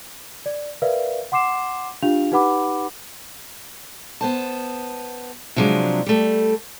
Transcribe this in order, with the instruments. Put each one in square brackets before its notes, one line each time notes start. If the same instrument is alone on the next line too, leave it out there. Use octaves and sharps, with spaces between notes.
[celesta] D5
A#4 B4 D5 E5 F5
F#5 C6 D6 C7 E7
D4 F4 G4 F5 F7
D#4 G4 B4 F#5 B5 D6
[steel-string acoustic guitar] B3 C5 A5
C3 F3 F#3 G#3 D4
G3 A3